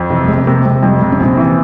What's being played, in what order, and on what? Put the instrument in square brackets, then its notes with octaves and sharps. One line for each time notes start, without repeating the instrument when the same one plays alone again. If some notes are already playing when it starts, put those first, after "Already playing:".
Already playing: [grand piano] F2
[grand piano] C3 [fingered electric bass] E3
[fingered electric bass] G3
[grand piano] F1 [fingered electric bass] G#3
[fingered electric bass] C4
[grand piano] C3 [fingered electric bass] A#3
[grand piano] C3 [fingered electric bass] G#3
[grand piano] F2 [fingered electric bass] G3
[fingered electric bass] G3
[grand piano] C3 [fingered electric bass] G#3
[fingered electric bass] C#4
[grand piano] A#1 [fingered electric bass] C4
[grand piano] E3